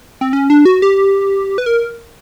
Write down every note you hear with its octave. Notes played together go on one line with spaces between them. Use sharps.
C4
C#4
D4
F#4
G4
B4
A#4